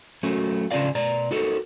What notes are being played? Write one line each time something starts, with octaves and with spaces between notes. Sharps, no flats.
F#3 A3 C#4 F#4
C#3 C#4 D4 F4 D5 F5
B2 D5 A#5
D#4 F#4 A4 A#4